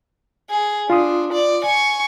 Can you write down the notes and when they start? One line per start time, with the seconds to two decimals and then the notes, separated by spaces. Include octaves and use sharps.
0.50 G#4
0.90 D4 F4 C6 D#6
1.33 D5
1.65 G#5 C#6